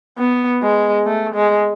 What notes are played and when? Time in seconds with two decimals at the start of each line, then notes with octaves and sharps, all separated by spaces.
0.18 B3
0.62 G#3
1.06 A3
1.35 G#3